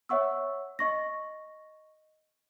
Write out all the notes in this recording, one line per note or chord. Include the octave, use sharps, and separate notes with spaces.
C#5 E5 F#5 C#6 E6
D#5 C#6 A#6